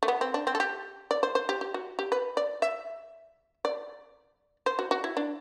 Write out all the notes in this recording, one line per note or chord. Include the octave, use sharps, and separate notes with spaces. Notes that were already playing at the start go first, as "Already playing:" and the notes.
A3
B3
C4
D4
C4
A4
G4
D5
C5
C5
G4
G4
F#4
G4
B4
D5
E5
D5
C5
F#4
F#4
E4
D4